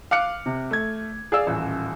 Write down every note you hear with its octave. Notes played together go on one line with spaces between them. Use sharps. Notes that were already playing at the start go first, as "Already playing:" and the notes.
F5 D6 F6 F#6 C#7
C3
A3 G#6
G#4 D5 F5 E6
D#1 A1